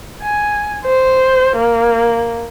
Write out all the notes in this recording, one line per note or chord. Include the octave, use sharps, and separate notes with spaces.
G#5
C5
A#3